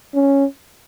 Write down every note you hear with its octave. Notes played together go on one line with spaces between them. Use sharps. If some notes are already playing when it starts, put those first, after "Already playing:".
C#4